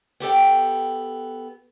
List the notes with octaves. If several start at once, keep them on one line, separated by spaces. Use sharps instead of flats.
B3 G4 A4 G5